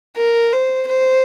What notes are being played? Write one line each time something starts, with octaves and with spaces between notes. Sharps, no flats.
A#4
C5
C5